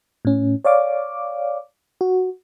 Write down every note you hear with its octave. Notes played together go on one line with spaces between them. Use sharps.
A2 C#4
C#5 D5 F5 D6
F#4